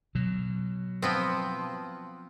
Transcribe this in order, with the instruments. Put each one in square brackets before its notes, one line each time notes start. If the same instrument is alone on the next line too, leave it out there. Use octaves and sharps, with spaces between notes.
[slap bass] B2 F#3
[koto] F3 B3 C4